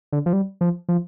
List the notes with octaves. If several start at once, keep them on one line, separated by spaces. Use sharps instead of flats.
D3
F3
G3
F3
F3